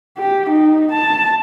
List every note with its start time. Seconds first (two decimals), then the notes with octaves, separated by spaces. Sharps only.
0.18 G4
0.50 D#4
0.92 A5